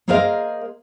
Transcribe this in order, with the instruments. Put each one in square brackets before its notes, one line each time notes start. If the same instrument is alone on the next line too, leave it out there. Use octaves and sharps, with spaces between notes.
[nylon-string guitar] A#3 G#4 A#4 C5 D#5 F5